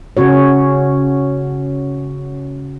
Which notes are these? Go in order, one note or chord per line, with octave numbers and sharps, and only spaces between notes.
C#3 C#4 F#4 C#5